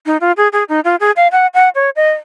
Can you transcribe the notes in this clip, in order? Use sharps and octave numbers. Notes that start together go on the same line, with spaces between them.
D#4
F4
G#4
G#4
D#4
F4
G#4
F5
F#5
F#5
C#5
D#5